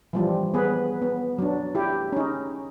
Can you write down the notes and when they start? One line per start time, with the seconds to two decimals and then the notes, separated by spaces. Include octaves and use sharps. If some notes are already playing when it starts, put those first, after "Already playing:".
0.13 E3 F3 G3
0.54 B3 G#4 B4
1.02 B3
1.38 F#3 D4
1.75 E4 G4
2.12 C#4 D#4